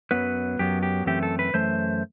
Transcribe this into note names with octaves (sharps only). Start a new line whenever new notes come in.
F#2 F#3 B3 B4
F#2 F#3 B3 G4
G4
F#2 E3 A3 C4 G4
A4
B4
F#2 E3 A3 C5